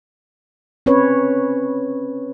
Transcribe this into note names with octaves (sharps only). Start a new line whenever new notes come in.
C4 C#4 B4 C#5